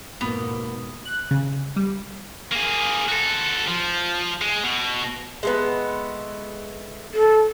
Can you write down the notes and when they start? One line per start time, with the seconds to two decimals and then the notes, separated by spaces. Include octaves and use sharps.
0.21 F2 G#2 B2 A#3 B3
1.05 F#6
1.31 C#3
1.76 G3
2.52 A#3 G#4
3.09 F#4 A4
3.68 F3
4.41 G#3
4.64 B2
5.43 G#3 A3 B3
7.13 A4